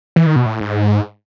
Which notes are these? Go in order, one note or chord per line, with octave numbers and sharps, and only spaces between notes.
E3
D#3
B2
A2
G#2